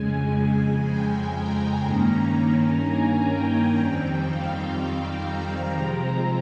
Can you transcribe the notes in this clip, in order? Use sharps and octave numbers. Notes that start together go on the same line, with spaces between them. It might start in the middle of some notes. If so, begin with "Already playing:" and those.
Already playing: F2 C#3 G#3 G#5
G5
A#5
G2 D#3 A#3 C#4
A#5
G#5
G5
F2 D#3 G3 C4
F5
F5
A#5
C3 F3 G#3 C4